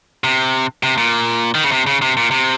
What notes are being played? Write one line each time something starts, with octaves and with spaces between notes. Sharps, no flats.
C3
C3
A#2
D#3
C#3
C3
C#3
C3
A#2
C3